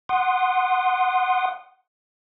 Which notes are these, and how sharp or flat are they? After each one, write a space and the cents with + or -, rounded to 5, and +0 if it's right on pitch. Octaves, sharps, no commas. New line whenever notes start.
F#5 +0 C6 +0 D#6 -25